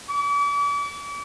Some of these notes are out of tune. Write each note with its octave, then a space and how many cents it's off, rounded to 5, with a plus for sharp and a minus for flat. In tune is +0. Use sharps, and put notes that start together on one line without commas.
D6 -40